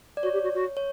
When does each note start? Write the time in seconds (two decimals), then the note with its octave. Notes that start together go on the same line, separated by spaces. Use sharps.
0.17 D5
0.23 F#4 C#5
0.33 G4
0.44 F#4
0.55 F#4
0.77 C#5